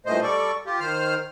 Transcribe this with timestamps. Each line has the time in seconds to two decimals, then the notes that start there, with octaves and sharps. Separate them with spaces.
0.06 G2 A#2 E3 A3 C5 D#5
0.23 G3 A4 D5 C#6
0.66 F4 G4
0.80 D#3 C5 F6